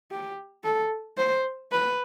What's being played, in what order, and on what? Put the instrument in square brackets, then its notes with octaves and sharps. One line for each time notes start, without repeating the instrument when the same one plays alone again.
[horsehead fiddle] G4
A4
C5
B4